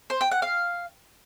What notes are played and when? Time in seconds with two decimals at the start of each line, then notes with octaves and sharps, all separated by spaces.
0.10 C5
0.21 G5
0.31 F#5
0.42 F5